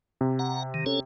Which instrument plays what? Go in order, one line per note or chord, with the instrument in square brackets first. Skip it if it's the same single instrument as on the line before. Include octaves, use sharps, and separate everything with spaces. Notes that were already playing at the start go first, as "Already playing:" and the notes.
[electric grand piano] C3
[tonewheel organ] F#5 A#5
D#3
C#4 A4 C#5